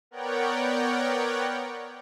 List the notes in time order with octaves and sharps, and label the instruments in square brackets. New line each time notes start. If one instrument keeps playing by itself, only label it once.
[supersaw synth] B3 A#4 C#5 D5 F#5 G5